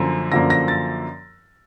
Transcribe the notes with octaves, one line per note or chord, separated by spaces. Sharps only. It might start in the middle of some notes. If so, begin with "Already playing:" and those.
Already playing: F#2 D3 F3 A#3
F#2 D3 F3 A#3 A#6
A#6
A6